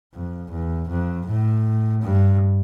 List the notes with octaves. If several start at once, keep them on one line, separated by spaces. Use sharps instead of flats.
F2
E2
F2
A2
G2